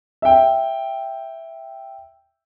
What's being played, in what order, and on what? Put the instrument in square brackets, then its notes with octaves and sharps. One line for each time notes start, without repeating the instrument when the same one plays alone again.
[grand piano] E5 G5